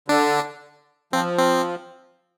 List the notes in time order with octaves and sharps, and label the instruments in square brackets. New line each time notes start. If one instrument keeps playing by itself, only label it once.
[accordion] D3 [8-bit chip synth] D4
[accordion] F3 [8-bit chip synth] C4
[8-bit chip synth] C4